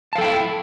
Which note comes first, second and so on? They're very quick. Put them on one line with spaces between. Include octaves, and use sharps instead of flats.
A5 F5 A4 G5 E4